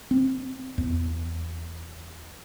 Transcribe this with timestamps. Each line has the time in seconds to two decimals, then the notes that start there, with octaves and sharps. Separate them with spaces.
0.11 C4
0.78 E2